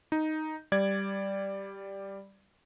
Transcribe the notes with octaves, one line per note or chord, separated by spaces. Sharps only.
D#4
G3 D5 G#6